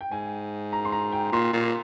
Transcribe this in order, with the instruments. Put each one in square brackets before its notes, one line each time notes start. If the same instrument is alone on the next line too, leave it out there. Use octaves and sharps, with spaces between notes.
[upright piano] G5
[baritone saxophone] G#2 [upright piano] G#5
[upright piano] A#5
C6
A#5
G5
[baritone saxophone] A#2 [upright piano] C6
[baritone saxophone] A#2